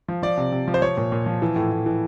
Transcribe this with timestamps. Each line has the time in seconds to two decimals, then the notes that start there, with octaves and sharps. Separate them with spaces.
0.08 F3
0.23 F3 D5
0.38 C3
0.52 C3
0.68 F3
0.74 C5
0.82 F3 C#5
0.97 A#2
1.12 A#2
1.26 F3
1.42 E3
1.56 A2
1.71 A2
1.86 E3